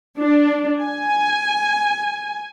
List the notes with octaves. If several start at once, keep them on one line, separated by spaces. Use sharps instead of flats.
D4
G#5